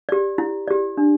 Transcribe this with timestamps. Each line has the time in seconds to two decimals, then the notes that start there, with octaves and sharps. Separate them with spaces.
0.09 G4 D5
0.38 E4
0.68 G4 D5
0.97 D4